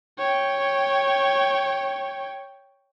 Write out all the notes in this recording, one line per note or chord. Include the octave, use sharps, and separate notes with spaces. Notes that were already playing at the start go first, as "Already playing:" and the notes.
C#5 G5